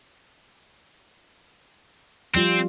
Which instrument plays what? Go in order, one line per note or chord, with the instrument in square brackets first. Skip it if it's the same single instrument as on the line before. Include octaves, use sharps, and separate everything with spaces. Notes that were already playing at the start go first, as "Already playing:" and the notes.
[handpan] F3 G3 F4 [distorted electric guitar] C4